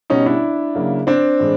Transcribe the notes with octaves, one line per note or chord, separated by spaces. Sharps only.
B2 G3 B3 C#4 D#4
D4 E4
C#3 F#3 A#3
C4 D4
A2 E3 G#3